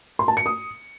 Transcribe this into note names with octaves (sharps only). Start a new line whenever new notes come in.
C6
A5
C#7
D#6